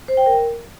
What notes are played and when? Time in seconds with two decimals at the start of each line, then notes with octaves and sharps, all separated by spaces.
0.08 C5
0.17 G5
0.26 A#4